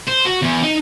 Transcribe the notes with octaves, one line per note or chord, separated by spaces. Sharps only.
C5
F#4
E2
D#4